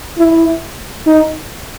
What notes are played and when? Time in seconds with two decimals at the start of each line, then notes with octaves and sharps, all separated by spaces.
0.19 E4
1.07 D#4